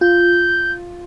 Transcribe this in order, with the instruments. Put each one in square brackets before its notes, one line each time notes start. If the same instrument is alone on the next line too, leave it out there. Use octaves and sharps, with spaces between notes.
[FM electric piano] F4 [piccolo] G6